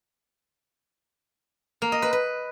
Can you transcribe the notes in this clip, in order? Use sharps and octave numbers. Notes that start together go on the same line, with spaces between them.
A#3
D#5
B4
B4